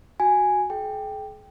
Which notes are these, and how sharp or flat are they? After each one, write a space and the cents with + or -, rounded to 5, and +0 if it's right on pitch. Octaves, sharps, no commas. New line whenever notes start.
F#4 +0 G#5 +0
G#4 +45 G5 +0